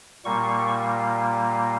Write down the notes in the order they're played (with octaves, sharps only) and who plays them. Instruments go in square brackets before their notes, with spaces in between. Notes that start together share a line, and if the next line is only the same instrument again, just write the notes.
[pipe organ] A#2 G3 A#3 C#6